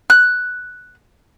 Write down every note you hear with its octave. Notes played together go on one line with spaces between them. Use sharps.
F#6